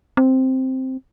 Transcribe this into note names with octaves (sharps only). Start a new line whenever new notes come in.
C4